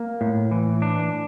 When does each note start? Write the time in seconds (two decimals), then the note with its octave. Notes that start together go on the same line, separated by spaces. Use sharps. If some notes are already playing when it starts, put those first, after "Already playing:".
Already playing: A#3
0.21 A2
0.52 E3
0.82 D4